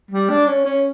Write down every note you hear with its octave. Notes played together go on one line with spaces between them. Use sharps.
G3
D4
C#4
C#4